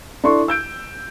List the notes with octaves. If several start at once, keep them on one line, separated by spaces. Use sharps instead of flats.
D4 E4 A4 C6 C#6
E6 G6 D7